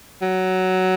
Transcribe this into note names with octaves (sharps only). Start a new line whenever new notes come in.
F#3